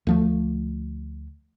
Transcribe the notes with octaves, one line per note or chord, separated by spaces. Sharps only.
D2 F3 A3